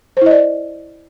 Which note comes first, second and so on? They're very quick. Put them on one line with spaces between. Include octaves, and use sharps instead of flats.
C5 E4 D#5 D5